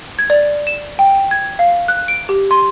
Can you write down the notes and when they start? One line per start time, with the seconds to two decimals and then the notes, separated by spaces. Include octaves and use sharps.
0.19 G#6
0.30 D5
0.67 E7
0.99 G5
1.31 G#6
1.59 F5
1.88 F#6
2.08 D7
2.29 G4
2.51 C6